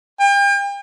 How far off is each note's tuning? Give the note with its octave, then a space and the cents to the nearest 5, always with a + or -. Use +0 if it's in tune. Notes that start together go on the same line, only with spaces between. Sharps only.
G5 +40